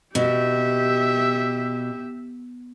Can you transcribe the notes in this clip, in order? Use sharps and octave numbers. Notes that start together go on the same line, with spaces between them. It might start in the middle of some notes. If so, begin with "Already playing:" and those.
B2 G4 E5